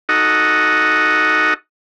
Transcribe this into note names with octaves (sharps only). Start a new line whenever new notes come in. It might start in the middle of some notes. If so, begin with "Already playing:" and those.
D#4 F#4 A4 D#5 F#5